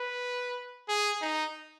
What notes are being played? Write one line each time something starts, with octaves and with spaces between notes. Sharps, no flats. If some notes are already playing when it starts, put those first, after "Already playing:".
Already playing: B4
G#4
D#4